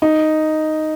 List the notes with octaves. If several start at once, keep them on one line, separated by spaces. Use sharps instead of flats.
D#4